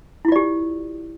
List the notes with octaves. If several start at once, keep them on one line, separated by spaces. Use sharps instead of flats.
E4 F4 G4 D5